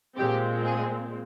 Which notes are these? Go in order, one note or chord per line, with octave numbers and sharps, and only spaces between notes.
A#2 G#3 C4 G4
G#4